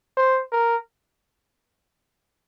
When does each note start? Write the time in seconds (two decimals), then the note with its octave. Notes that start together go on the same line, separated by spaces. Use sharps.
0.17 C5
0.52 A#4